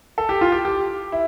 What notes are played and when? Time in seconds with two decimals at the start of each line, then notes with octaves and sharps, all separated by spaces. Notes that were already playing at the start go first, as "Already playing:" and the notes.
0.18 A4
0.29 G4
0.41 F4
0.52 G4
0.65 G4
1.12 E4